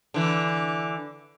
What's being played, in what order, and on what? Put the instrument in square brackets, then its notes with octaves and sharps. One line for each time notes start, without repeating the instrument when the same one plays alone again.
[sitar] D3 E3